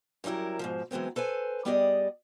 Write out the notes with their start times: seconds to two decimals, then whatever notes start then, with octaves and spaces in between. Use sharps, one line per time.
0.24 F#2 F#3 G3 E4 A#4
0.59 G#2 B2 F3
0.91 E3 F#3 G#3 B3 C4
1.16 A4 B4 C5 G#5
1.65 G3 B3 G4 G#4 D5 D#5